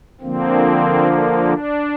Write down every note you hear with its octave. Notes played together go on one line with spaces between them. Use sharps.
D3 F3 A#3 C4
D4